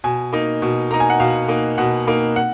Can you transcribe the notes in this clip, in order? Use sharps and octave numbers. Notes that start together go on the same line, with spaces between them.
B2 G#5
A#3 D#4
B2
A#3 D#4 A#5
G#5
F#5
B2 F5
A#3 D#4
B2 F#5
A#3 D#4
F#5